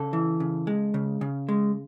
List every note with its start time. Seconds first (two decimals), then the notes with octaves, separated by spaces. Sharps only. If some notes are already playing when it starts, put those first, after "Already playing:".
Already playing: C#3 A4
0.13 E3
0.40 C#3
0.67 G#3
0.94 C#3
1.21 C#3
1.49 G#3